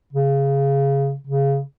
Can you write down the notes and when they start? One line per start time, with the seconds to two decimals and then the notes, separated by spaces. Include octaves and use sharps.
0.13 C#3
1.27 C#3